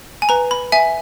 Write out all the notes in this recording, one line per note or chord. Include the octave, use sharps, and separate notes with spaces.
G#5
B4 A#5
B5
E5 G#5